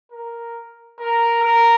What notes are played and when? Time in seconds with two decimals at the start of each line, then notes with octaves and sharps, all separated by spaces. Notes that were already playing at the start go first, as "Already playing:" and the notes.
0.12 A#4
1.00 A#4
1.43 A#4